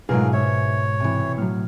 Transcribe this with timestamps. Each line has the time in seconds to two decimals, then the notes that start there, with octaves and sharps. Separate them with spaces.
0.09 G#2 B2 F#3 A3 F4 G#4 A#4
0.33 G#2 C#5 E5
1.00 C3 E3
1.38 A2 F#3 F6